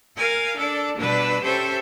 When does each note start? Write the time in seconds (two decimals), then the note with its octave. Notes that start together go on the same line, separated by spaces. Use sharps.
0.17 A#4 F5 G#5
0.56 D4 A4 D5 A5
0.97 B2 G3 D4 B4 E6
1.43 C#4 G4 A4 C5 E5 G5